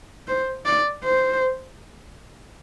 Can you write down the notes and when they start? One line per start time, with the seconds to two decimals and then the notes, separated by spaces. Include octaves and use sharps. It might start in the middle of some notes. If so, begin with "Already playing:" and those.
0.28 C5
0.66 D5
1.04 C5